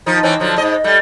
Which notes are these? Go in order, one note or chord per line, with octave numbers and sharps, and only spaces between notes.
D#3 F3 D#4
E3 C4 C#4
D3 F3 F#3
G#2 D#5
G3 A3